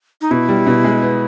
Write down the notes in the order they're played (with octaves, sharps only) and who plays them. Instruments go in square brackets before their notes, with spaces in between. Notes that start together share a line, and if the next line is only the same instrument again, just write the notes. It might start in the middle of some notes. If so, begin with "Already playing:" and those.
[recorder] D#4
[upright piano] B2 [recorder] E4
[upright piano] G3
B2
G#3
B3